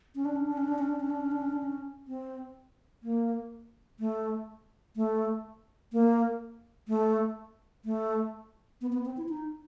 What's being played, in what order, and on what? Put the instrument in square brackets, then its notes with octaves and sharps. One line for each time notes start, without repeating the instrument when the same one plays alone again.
[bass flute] C#4
D4
C#4
D4
C#4
D4
C#4
D4
C#4
D4
C#4
D4
C#4
D4
C#4
C4
A#3
A3
A3
A#3
A3
A3
B3
B3
C4
E4
D#4